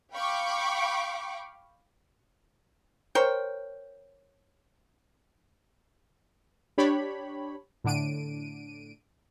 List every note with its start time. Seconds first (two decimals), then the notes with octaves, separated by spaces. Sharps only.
0.13 F5 G5 B5 C#6 D6
3.15 A#4 C5 C#5 G5
6.78 D4 G4 C#5 B5
7.84 A2 D3 D4 D7 D#7